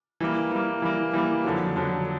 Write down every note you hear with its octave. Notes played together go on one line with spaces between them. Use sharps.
E3 G3 A#3
E3 G3 A#3
E3 G3 A#3
E3 G3 A#3
F2 D3 F#3
F2 D3 F#3